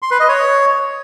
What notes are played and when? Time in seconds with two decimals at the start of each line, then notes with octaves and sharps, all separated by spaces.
0.02 C6
0.11 B4
0.20 D#5
0.28 C#5